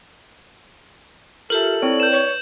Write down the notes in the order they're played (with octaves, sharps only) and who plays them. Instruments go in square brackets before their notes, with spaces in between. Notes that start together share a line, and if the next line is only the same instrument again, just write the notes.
[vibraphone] F4 G4 E5 [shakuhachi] A4 [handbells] A#4 [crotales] F#7
[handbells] C4 E4 C#5 [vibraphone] D5
[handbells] B4 [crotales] G6 E7
[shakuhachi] C#5